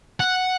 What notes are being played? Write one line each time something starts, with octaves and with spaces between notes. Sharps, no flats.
F#5